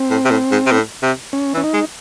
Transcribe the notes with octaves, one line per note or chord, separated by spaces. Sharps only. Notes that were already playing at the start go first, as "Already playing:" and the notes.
Already playing: C4
A2
C3
A2
G#2
C3
A2
C3
C#4
E3
C#4
D#4
G#3